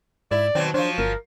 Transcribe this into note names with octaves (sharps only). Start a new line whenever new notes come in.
G#2 E4 D5
B2 D#3 F#3 C4
F3 F#3 D4 C5
G1 A#4